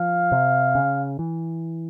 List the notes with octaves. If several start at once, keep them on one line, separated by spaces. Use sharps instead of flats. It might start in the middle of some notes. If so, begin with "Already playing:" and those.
Already playing: F3 F5
C3
C#3
E3